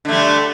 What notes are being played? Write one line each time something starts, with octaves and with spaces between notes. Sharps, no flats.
D3 G3 A3